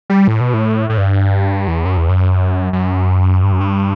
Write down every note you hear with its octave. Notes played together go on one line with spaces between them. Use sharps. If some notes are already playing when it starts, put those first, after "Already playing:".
G3
A2
B2
A2
A2
G2
E2
F#2
E2
F#2
F#2
G2
F#2
G2